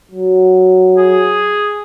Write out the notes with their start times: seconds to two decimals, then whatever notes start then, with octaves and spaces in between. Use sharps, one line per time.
0.11 F#3
0.97 G#4